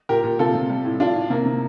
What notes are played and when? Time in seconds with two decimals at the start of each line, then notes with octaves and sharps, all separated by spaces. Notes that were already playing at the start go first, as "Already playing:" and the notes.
0.09 A#2 G4 A#4
0.24 A#2
0.39 C3 F4 A4
0.55 C3
0.70 G3
0.85 A2
1.00 A2 D4 F4
1.16 A2
1.30 C3 A#3
1.45 C3